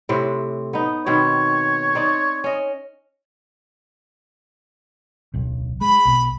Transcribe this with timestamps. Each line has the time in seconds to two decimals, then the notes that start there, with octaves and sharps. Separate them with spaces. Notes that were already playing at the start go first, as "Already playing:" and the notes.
0.09 A2 C3 C4
0.73 B3 D#4
1.06 B2 D#3 C4 C#5
1.95 C4 D#4 D5
2.44 C#4 D#5
5.34 D1 B1
5.81 G#3 B5
6.05 B1 B2